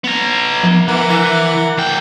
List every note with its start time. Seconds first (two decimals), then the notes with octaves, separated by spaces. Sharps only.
0.04 B3 A#5
0.63 F3
0.88 E3 A#4 F#5 D6
1.10 E3 F#6
1.78 D2 G5